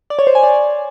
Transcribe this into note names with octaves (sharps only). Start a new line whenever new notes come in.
D5
C#5
C5
G#5
D5